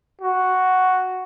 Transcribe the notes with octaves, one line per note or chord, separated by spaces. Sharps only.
F#4